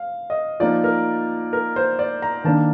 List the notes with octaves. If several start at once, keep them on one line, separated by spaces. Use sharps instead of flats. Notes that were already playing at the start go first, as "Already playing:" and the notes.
Already playing: F5
D#5
F3 A#3 D#4 D5
A#4
A#4
C5
D5
A#5
D#3 A#3 D4 A5